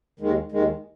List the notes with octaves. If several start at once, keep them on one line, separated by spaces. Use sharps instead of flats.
D#2 D#3 G#3
D#2 D#3 G#3